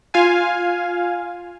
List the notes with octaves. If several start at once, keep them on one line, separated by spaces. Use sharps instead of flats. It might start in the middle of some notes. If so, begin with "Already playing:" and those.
F4 F5 G#5